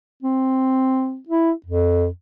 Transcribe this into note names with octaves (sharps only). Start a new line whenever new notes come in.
C4
E4
F2